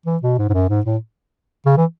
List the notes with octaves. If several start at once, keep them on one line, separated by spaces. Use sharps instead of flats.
E3
B2
G#2
G#2
F#2
G#2
A2
C#3
E3